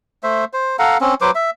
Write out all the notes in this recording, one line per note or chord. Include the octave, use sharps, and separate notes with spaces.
A3 C5 E5
C5
A4 F5 F#5 A#5
C4 C#4
F#3 B4 C5 D6
E5